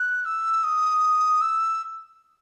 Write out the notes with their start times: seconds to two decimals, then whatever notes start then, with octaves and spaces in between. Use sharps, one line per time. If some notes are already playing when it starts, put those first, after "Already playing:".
Already playing: F#6
0.25 E6
0.63 D#6
1.41 E6